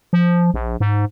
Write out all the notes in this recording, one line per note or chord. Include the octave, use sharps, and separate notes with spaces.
F3
A#1
G#2